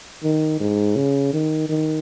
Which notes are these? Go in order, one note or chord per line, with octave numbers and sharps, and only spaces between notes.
D#3
G#2
C#3
D#3
D#3